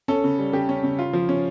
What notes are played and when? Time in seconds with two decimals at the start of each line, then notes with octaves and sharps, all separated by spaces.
0.08 C#4 A4
0.24 C#3
0.39 G3
0.53 C#3 G4
0.69 C#4
0.83 C#3
0.99 F4
1.13 F3
1.29 C#4